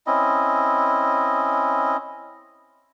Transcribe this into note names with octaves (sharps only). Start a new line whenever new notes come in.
C4 C#4 E4 D#5